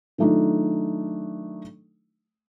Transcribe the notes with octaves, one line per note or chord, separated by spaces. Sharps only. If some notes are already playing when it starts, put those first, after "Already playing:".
D#3 F#3 A3 D4 D#4 F4